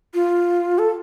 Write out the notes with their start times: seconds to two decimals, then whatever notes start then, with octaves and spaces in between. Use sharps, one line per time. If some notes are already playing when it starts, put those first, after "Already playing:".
0.14 F4
0.78 A4